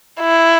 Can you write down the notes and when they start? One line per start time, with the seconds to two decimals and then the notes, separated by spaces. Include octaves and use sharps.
0.20 E4